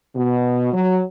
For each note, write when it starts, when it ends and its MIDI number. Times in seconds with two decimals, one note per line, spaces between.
0.16 0.72 47
0.73 1.00 54